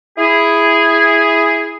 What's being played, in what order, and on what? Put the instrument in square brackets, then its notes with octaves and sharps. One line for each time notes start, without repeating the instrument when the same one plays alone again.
[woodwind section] E4 G#4